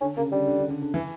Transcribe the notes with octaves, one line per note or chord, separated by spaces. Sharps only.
D3 C#4
C#3 A#3
D3 G3
D3
D3
D3
D3
E3